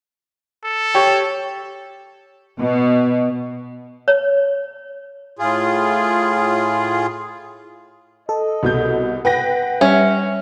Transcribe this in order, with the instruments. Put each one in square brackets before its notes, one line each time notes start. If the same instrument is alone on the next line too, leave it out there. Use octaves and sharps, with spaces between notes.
[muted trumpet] A4
[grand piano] G4 C#5
[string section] B2
[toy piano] C#5
[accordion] A2 F4 G#4
[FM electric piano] A4 [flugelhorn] D#5
[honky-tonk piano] C2 B2 G6
[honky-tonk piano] B4 G5 A#6 [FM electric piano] F#5
[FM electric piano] G3 [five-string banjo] C#4 [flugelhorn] E5